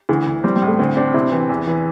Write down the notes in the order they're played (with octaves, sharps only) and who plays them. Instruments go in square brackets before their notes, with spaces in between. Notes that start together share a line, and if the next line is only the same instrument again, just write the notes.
[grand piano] D2 [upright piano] E3
[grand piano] D2
[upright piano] G3 [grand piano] C4
[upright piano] G3
[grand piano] A2
[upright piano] A3
[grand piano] D2 [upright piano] C4
[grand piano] C4 [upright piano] D4
[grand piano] C3 [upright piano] E4
[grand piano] E3
E2
E3